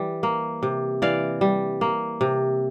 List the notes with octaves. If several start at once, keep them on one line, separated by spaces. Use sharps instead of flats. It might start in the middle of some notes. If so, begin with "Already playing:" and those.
Already playing: E3 G3
A#3
C3
E3 D5 F5
G3
A#3
C3